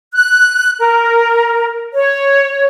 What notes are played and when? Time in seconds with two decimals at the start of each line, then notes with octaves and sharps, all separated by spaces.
0.13 F#6
0.79 A#4
1.93 C#5